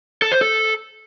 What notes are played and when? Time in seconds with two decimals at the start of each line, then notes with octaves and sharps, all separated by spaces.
0.22 A4
0.32 C5
0.41 A4